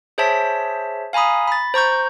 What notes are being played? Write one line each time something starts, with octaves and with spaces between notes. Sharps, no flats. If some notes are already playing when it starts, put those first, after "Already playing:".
G#4 C5 C#5 E5 A5 B6
F5 G#5 A#5 B5 D#6
B5 A6
C5 A#5 C#6 G6